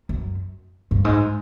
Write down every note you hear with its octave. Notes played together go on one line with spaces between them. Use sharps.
F#2
G2
G#2